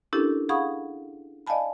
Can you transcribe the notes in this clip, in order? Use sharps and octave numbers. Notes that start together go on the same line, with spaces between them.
C#4 D4 E4 G4 A4 A#4
G#4 F5 F#5 B5 C#6 D#6
D5 D#5 F5 G#5 A5 B5